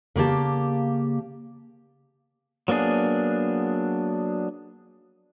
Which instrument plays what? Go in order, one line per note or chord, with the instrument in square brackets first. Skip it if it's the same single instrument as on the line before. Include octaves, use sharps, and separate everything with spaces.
[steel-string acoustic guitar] C#3 A#3 G4 A5
[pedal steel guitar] F#3 A#3 B3 D4 G#4